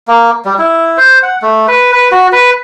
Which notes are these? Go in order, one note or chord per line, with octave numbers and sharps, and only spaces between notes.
A#3
G3
E4
C5
F#5
A3
B4
B4
F#4
B4